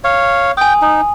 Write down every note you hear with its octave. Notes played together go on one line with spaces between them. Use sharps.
C#5 F5
G5 G#5 D#6
D#4